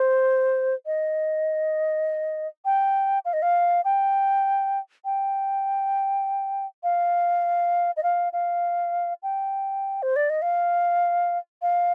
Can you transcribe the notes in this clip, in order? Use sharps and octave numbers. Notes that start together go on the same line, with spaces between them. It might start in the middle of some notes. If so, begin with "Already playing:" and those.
Already playing: C5
D#5
G5
F5
D#5
F5
G5
G5
F5
D#5
F5
F5
G5
C5
D5
D#5
F5
F5